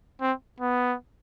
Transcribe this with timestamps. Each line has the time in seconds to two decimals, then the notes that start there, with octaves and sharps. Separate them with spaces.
0.21 C4
0.60 B3